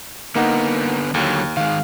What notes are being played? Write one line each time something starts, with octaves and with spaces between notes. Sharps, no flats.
D3 A#3 B3 D#4 F#5
D#2 D3 F#3
D#3 G#3 F5